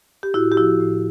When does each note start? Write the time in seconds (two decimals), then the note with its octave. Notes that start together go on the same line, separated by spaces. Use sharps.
0.23 G4
0.34 A2 E4 F#4
0.52 G4
0.57 F3 E4 F#4
0.80 A2